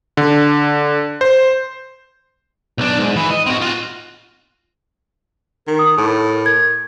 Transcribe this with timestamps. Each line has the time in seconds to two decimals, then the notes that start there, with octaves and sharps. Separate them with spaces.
0.17 D3
1.21 C5
2.78 B1 D4
2.99 G#2
3.16 E3
3.31 D#5
3.46 C4 F#4
3.61 F4 F#4
5.67 D#3 A#4
5.79 D#6
5.97 A2
6.46 G#6